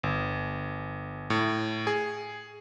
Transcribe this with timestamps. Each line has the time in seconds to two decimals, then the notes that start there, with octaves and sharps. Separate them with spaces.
0.03 G1
1.30 A2
1.87 G#4